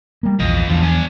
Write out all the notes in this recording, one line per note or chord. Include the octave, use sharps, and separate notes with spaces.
G3 A#3
A#1 E2 F3 D#5
E2 D3 F3
D4 G#5